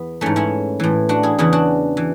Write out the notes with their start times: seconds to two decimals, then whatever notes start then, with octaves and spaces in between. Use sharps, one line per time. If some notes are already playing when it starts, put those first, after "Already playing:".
Already playing: E2 B3
0.21 G#2 E3 A3 C#4
0.36 C#4 E4
0.80 A2 E3
1.09 D4 F#4
1.23 E4 G#4
1.38 E2 C#3 E3 E4 G#4
1.53 D4 F#4
1.97 E3